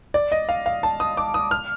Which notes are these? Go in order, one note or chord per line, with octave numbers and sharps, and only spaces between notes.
D5
D#5
F5
F5
A5
D#6
D6
D#6
F6